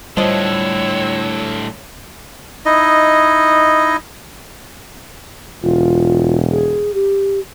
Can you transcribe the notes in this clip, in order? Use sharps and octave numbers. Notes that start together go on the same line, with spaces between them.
A2 D3 F3 G3 C#5 D#5 E6
D#4 E4 D#5
E1 F4
G#4
G4